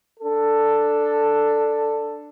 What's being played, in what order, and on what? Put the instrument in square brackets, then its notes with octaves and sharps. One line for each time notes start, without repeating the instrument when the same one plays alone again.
[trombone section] D4 A4